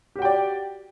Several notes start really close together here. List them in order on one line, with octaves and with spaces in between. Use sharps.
G4 F#4 G5 D5